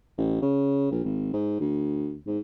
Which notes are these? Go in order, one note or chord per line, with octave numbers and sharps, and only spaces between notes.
A1
C#3
A#1
G#1
G#2
D2
G#2